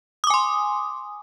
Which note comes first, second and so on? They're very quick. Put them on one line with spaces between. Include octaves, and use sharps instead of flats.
D#6 D6 G#5 C6